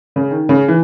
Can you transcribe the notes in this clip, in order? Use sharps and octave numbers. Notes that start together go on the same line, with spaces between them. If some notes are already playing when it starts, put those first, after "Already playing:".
C#3
D#3
C#3
E3